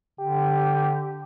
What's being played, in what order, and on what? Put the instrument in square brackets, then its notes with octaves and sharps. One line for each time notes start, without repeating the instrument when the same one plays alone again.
[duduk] D3 [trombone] G4